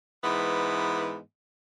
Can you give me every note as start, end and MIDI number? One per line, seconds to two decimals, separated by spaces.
0.23 1.18 44
0.23 1.18 52
0.23 1.18 59